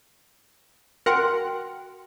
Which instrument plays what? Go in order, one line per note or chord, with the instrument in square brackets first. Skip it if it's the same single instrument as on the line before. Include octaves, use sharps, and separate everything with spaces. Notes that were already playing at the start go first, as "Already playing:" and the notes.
[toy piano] F#4 G5 C6 [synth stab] A#4 F#5